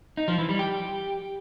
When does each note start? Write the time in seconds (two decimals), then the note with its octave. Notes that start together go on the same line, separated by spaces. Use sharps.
0.17 D#4
0.28 F3
0.38 E3
0.49 G3
0.59 G4